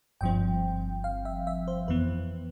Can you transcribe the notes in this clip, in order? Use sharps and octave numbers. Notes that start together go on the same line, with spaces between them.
G1 G2 F3 C4 G5
F5
E5
E5
C5
F2 E3 B3 B4